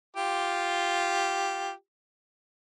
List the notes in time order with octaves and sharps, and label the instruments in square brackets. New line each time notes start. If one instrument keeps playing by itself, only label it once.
[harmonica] F4 G4